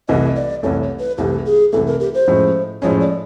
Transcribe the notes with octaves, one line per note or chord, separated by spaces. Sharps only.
C2 C3 E3 A3 D#5
D5
C2 C3 E3 A3 C#5
B4
C2 C3 E3 A3 G4
G#4
C2 C3 E3 A3 A4
A#4
G4
C5
A2 F3 G#3 C#4
A2 F3 G#3 C#4 C#5
D5